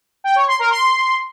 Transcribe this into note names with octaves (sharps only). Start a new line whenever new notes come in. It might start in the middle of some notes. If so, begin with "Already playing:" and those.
G5
C#5
C6
A#4
C6